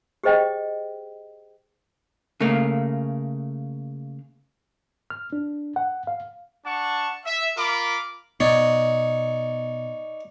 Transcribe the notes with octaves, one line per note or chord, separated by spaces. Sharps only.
G4 G#4 C5 D#5 G5
C#3 A3 A#3
F6
D4
F#5
F5
D4 F#5 A5 C#6
E5
F4 A#4 B5 D6
B2 B3 D#4 C#5 D5